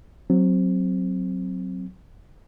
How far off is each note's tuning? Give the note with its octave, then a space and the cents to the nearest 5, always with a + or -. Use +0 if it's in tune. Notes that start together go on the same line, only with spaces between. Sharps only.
F#3 +0 C4 +5